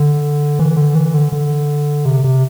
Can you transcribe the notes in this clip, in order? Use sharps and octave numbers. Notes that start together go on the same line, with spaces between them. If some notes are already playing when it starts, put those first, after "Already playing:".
Already playing: D3
E3
D3
E3
D3
D3
C3
C3